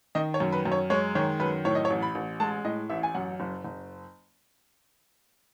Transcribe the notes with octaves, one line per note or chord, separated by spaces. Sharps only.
D#3 D#5
C#5
F#2
B4
F#2
C#5
G#3 C#5
D#3 C#5
F#2 B4
A2 C#5
D#5
C#5
A1
B5
A1
G#3 A5
A2 D#5
A1 E5
G#5
F#2 F#5
F#1
F#1